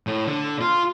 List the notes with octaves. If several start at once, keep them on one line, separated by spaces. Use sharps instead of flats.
A2
D3
F4